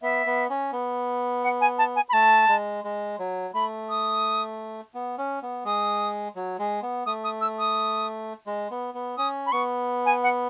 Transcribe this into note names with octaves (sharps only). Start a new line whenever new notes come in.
B3 E5
B3
C#4
B3
F#5
G#5
A5
G#5
B5
A3 A5
G#3
G#3
F#3
A3 B5
D#6
B3
C#4
B3
G#3 D#6
F#3
G#3
B3
A3 D#6
D#6
E6
D#6
G#3
B3
B3
C#4 D#6
B5
B3 C#6
G#5
F#5